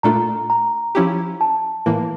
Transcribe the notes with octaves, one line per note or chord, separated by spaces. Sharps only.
A#2 A3 D4 F4 A4 A#5
A#5
F3 C#4 E4 G4
A5
A2 E3 A#3